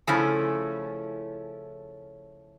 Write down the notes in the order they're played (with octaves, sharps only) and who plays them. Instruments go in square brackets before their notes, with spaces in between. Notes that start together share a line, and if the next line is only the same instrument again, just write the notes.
[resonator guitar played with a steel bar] C#3 F3 A3 C#4 E4